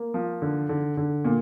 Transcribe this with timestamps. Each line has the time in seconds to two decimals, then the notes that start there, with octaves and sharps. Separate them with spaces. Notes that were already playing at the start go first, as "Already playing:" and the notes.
Already playing: A#3
0.14 F3
0.42 D3
0.69 D3
0.97 D3
1.25 A#2